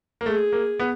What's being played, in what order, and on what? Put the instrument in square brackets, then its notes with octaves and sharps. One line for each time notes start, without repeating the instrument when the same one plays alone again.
[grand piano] A#3
[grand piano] A3 [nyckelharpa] G#4
[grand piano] A#3
B3